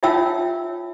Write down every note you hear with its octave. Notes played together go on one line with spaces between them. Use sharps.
D#4 F4 C#5 E5 G5 E6